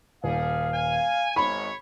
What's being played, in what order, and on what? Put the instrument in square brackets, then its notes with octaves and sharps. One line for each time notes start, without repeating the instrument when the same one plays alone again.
[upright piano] D#1 [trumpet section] G3 G#4 [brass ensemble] F5
[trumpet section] G#5
[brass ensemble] G#1 G#2 [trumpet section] C#5 [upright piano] B5